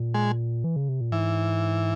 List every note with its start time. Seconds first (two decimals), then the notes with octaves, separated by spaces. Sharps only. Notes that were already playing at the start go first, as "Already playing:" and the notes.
Already playing: A#2
0.14 G#3
0.64 E3
0.76 C#3
0.89 C3
1.01 A#2
1.12 G#2 E3